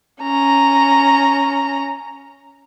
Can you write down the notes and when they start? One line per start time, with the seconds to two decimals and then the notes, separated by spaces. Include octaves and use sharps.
0.22 C#4 A#5